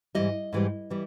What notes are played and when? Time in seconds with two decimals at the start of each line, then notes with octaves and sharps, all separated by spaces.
0.15 G#2 E3 G3 D#5
0.53 G#2 E3 G3
0.90 E3 G3